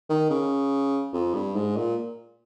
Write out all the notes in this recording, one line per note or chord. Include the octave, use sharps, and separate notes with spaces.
D#3
C#3
F2
G2
G#2
A#2